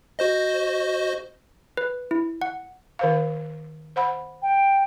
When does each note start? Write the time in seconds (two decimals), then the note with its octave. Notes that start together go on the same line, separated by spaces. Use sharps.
0.19 F#4 C5 D#5
1.77 B4
2.11 E4
2.41 F#5
2.99 D#3 C5 F5
3.96 C5 F#5 B5
4.42 G5